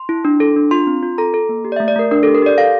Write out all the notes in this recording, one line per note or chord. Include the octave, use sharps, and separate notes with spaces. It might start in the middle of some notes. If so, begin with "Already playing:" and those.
Already playing: C6
E4
D4
A4
D4
F4 C6
C4
F4
A4 A#5
A4
A#3
G4
D5
A3 E5
D5
A3 A#4
D4 A#4
G4 A4
A#4
G4 D5
A4 F5